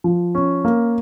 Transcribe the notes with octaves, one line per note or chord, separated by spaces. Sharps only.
F3
C#4
A#3